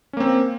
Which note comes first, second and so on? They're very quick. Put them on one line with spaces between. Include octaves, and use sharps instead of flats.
C#4 A#3 C4